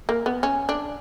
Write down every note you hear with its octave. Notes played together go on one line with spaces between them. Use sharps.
A#3
B3
C#4
D4